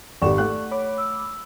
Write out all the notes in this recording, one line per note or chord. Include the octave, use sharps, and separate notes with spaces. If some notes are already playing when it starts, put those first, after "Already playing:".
G#1 G4 A4 D5 F#5 C#6 E7
A3 F#5 F#6
C#5 B5 D6
E6